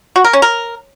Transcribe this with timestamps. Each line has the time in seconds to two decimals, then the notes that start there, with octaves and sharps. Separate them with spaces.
0.16 F#4
0.24 A#4
0.33 C#4
0.42 A#4